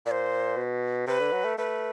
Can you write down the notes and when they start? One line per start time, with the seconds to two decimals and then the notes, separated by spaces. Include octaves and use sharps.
0.06 A#2 D5
0.11 C5
0.56 B2
1.07 C3 B4
1.20 D3
1.32 F#3
1.45 A3
1.58 A3 B4